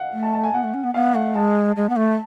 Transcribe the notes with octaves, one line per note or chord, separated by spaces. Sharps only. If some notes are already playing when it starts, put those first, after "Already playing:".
Already playing: F5 F#5
A3
A5
A5
G#5
B3 F#5
A3
C#4
B3
B3 F5
A3 F#5
G#3 A5
G#3
B3
A3